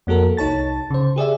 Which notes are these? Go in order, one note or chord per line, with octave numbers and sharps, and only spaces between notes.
F2 A#3 F#4 A4 A#4
C2 D#4 C#5 A5 A6
C#3 C5
G4 G#4 D5 E5